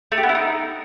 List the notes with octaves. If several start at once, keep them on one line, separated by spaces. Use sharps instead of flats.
A3
G4
B3
E4
D#4